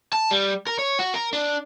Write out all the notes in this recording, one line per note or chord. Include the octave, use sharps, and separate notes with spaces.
A5
G3
A#4
C#5
F#4
A#4
D4